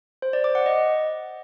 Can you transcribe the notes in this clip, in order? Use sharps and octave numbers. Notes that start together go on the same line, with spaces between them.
C5
D5
D6
F#5
D#5